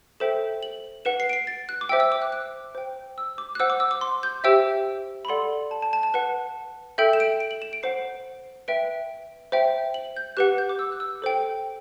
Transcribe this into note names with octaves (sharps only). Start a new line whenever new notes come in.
A4 C5 E5 G5 E7
F#7
B4 F#5 E7
C7
D7
C7
A6
F#6
D6
C5 E5 G5 E6
E6
D6
F#6
F#6
C5 G5
E6
D6
F#6
C5 F#5 E6
D6
E6
D6
C6
G6
G4 C5 E5 G5 E6
B5
A4 D5 F#5 C6
A5
A5
A5
A5
B4 F#5 F#6
A4 E5 G5 G6
E7
D7
D7
F#7
E7
D7
C5 F#5 C7
B4 E5 G5 D7
C5 E5 G5
F#7
G6
G4 B4 F#5 F#6
G6
D6
E6
F#6
E6
A4 C5 G5